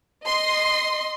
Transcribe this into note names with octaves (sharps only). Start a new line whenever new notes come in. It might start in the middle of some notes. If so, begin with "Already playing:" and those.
D#5 C6